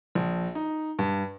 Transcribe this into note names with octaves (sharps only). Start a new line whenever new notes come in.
A#1
D#4
G2